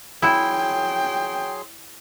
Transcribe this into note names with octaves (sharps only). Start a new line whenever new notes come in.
F#3 E4 G#4 G5 C6